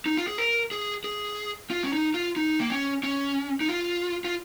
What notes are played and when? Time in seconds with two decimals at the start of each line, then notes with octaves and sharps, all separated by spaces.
0.06 D#4
0.17 F4
0.28 G#4
0.38 A#4
0.71 G#4
1.04 G#4
1.70 F4
1.84 C#4
1.93 D#4
2.14 F4
2.36 D#4
2.60 A#3
2.70 C#4
3.03 C#4
3.61 D#4
3.69 F4
4.25 F4